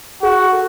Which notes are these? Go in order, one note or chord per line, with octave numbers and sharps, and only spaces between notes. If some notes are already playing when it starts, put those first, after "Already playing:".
F#4 G#4
A4